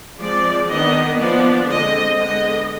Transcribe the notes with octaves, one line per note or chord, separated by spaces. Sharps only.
F3 G#3 C4 D5
D#3 B3 D4 D#5
F3 B3 D4 D5
D3 G#3 C4 D#5
D3 G#3 B3 D#5